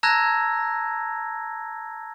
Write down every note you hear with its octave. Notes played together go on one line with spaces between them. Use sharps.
A5 A#5 E6 F#6 G#6 A#6